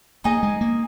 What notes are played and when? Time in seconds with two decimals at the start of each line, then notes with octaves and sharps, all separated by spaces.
0.24 A#3 D#4 G#4 D#5
0.43 G#3
0.61 A#3